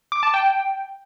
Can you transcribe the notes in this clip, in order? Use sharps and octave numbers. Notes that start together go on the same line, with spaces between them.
D6
A5
G5